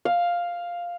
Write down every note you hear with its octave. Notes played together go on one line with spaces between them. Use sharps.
F5